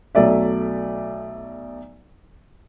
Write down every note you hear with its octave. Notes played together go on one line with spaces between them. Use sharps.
B1 F#3 A3 D5 E5